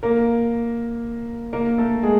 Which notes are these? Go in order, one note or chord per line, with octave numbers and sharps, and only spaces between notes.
A#3 A#4
A#3 A#4
A3 A4
G#3 G#4